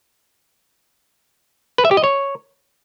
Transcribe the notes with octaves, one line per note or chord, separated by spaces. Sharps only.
B4
E5
G4
D#5
C#5